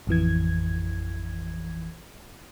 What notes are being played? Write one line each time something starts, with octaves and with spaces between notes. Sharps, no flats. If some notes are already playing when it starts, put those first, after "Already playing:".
A1 F2 E3 G#6